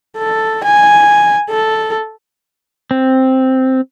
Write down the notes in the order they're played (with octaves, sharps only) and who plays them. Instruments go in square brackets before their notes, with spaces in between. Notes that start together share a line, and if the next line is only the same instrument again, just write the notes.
[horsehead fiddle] A4
G#5
A4
[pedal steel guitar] C4